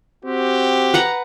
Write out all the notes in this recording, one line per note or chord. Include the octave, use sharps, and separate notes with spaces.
C4 F#4 G4
B4 F#5 A#5